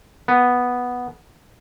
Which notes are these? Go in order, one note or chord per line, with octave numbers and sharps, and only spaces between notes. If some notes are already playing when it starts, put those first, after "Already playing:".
B3